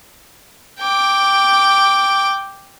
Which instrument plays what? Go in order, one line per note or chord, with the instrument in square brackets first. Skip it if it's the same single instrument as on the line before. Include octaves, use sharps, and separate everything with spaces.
[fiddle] G5 D6